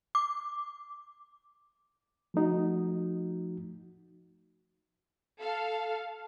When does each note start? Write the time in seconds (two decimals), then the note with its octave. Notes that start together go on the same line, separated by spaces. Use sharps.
0.15 D6
2.34 F3 A3 D#4 F#4
5.40 A4 F5